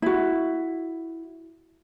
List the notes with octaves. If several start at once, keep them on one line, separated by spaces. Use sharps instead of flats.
E4 F#4